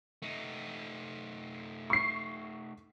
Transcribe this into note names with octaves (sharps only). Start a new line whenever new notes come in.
A3 D#4
C#6 C7